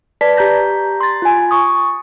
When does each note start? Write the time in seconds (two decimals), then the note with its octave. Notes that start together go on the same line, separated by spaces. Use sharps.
0.21 B4 D5 A5 B6
0.36 G4 A#5 G6 A#6 B6
1.00 C6 A6
1.22 F4 G#5
1.51 C#6 D#6